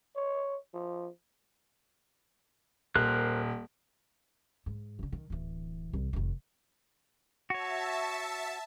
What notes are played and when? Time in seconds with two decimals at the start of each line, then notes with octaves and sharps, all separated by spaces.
0.15 C#5
0.73 F3
2.96 D#1 A#4 C5 F#6
4.66 G#2
4.99 D3 E3
5.12 D#3
5.30 D1 E3
5.93 C2
6.13 F1 D#3
7.50 F#4 C#5 E5 A5